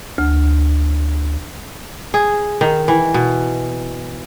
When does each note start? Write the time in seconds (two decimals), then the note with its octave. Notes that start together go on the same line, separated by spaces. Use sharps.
0.18 D2
2.14 G#4
2.61 D#3
2.88 E3
3.14 B2